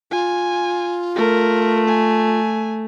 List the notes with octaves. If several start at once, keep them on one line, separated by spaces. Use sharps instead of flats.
F4 G#5
A3 A#4
G#5